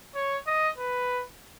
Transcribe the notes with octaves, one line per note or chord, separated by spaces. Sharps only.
C#5
D#5
B4